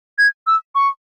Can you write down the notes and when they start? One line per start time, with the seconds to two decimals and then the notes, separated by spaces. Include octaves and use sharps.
0.19 G#6
0.47 E6
0.75 C#6